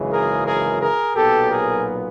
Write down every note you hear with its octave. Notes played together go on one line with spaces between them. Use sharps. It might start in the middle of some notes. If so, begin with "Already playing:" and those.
Already playing: G#1 F#2 C#3 E3 G#3
G#4 A#4
G#4 A#4
G#4 A#4
B1 A#2 F#3 B3 G4 A4
G#4 A#4